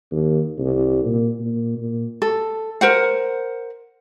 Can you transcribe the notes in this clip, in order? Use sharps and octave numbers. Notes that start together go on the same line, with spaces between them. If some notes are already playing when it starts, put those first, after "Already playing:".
D#2
C2
A#2
A#2
A#2
A4
A#4 C5 F#5